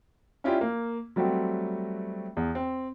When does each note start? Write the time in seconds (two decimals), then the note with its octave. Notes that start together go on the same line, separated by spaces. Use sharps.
0.44 C#4 E4 F4 G4 D5
0.61 A#3
1.16 F#3 G3 A3 C4 F#4
2.37 E2
2.55 C4